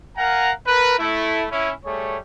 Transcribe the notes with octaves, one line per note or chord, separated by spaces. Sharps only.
A#4 F5 F#5 G#5 A#5
A#4 B4
A3 E4
C#4 E4
G3 A3 G#4 C#5